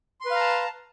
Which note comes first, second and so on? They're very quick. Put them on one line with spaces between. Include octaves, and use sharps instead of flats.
C6 B4 F5 A#5 A5